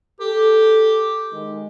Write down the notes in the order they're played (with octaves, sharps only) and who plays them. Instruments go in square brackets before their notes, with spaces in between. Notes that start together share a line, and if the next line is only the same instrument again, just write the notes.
[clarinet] G4 [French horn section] A4
[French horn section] D#3 G#3